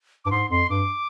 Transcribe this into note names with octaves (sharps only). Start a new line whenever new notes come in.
G2 D6
G#2 C6
F2 C6
G2 D6